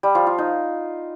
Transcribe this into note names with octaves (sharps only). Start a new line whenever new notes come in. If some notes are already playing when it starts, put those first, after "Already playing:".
G3
F3
F4
D#4